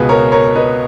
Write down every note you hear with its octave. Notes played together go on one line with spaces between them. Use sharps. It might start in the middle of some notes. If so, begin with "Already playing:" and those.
Already playing: C#2 B2 G#4 B4
A#4 C#5
A#4 C#5
B4 D#5